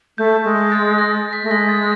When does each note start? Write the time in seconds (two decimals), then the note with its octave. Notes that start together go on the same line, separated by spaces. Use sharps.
0.18 A3 G6
0.44 G#3
0.72 A6
0.98 A#6
1.33 B6
1.43 A3
1.51 G#3 A#6
1.69 A6